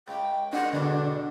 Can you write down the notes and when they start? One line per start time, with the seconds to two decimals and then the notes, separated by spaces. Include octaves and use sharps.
0.08 C#2 G5
0.53 D#3 G#3 D4 F#5
0.73 E2 B2 D3 D4